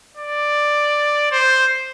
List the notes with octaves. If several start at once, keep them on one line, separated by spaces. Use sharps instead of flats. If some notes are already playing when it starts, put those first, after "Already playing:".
D5
C5